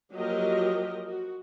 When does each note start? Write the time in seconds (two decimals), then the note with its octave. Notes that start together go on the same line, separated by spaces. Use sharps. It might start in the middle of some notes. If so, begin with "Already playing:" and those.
0.13 F3 F#3 A#3 G4 A#4 D#5
1.06 F#4